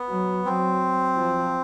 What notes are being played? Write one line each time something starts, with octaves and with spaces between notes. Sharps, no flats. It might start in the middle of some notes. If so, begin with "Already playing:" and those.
Already playing: B3
F#3
F#3 C4
F3